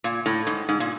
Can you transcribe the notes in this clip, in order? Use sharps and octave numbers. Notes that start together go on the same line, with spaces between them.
A#2
A2
G#2
G#2
A#2